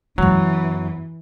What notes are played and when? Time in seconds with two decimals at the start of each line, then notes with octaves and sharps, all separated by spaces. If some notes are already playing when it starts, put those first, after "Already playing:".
0.18 F#2 E3 F#3 B3